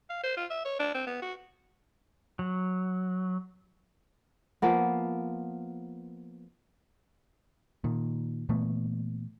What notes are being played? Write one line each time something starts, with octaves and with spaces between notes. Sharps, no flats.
F5
C5
F4
E5
C#5
D4
C4
B3
F#4
F#3
F3 A#3 B3
A#2 D#3
A#2 E3 A3 B3